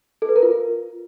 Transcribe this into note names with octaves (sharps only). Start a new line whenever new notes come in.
A4
B4
A#4
F4